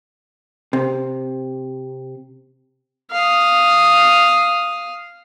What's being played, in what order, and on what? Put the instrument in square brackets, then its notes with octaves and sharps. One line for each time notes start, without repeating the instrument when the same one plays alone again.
[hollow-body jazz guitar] C3
[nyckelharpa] F5 D#6